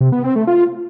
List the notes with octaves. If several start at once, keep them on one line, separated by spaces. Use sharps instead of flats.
C3
B3
C4
A3
F4